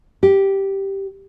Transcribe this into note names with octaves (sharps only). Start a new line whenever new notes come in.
G4